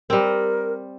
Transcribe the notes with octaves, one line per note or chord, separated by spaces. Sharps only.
G3 C4 A#4